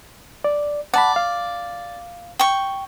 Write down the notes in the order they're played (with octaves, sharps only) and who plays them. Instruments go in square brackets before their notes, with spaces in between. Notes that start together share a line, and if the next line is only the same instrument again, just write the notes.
[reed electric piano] D5
[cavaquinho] D5 [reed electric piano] F#5 A5 B5
[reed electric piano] F5
[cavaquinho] G5 C#6